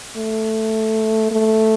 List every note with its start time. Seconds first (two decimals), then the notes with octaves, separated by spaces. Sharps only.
0.17 A3
1.31 A3